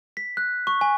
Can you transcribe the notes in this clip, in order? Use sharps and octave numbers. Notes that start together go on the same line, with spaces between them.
B6
F#6
C#6
G#5